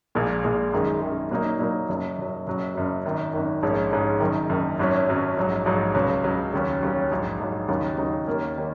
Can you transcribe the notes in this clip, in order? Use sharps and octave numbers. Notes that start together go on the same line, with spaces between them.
A#1 A#2 G#3
A#1 A#2 G#3
F#2 D#3 G#3
F#2 D#3 G#3
A#2 F#3 A#3 D#4
A#2 F#3 A#3 D#4
F#1 F#2 F#3
F#1 F#2 F#3
F#1 F#2 F#3
F#1 F#2 F#3
G#1 F#2 D#3
G#1 F#2 D#3
A#1 G#2 G#3 C#4
A#1 G#2 G#3 C#4
F#1 F#2 D#3
F#1 F#2 D#3
G#1 F#2 F#3 C#4
G#1 F#2 F#3 C#4
A#1 G#2 F#3
A#1 G#2 F#3
C#2 C#3 F#3
C#2 C#3 F#3
D#2 C#3 F#3 C#4
D#2 C#3 F#3 C#4
A#1 G#2 F#3
A#1 G#2 F#3
D#2 C#3 F#3 D#4
D#2 C#3 F#3 D#4
D#2 D#3 A#3 C#4
D#3 A#3 C#4